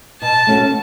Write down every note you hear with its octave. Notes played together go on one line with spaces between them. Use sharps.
B2 A5
A3 C#4 F#4 A4